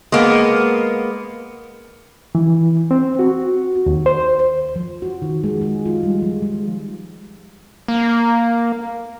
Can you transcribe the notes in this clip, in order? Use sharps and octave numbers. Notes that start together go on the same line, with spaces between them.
G#3 A#3 B3
E3
C4
F#4
D#2
C5
F3
F#4
D#3
G#3
G#4
F4
G3
F3
G#3
A#3